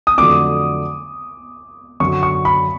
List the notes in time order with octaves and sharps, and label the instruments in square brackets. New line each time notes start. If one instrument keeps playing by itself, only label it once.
[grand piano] D#6
[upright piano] F2 D3 F#3 A3 D4 [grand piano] D6
[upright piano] F#2 D3 F#3 [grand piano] C#6
[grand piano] C#6
B5